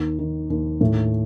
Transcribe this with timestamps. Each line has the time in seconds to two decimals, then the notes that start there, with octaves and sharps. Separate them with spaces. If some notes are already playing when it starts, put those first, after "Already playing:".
Already playing: D#2
0.19 D#3
0.50 D#2
0.81 A2